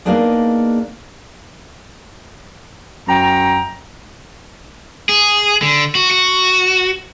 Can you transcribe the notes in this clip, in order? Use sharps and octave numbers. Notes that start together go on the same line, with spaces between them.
A#3 B3 D4 D#4 G#4 D5
F#2 G5 A#5
G#4
D3
F#4
F#4